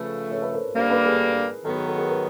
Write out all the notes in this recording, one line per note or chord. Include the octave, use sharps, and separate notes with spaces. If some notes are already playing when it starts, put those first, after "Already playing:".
Already playing: C#3 F3 A3 A4 B4
B4 C#5
A4 B4
A#4 C5
G2 D3 G3 A#3 A#4 C5
A4 B4
G#4 A#4
D#3 F#3 B3 A4
G#4
A4
G#4 A#4
A4 B4